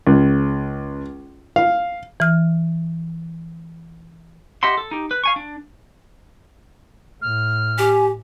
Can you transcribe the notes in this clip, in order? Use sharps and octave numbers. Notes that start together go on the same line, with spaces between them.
C#2
F5
E3 F6
G4 D#5 E5 F#5 C6
A4
D#4 G4
B4
F5 G#5 C#6
D4
A2 F6
G4 G#5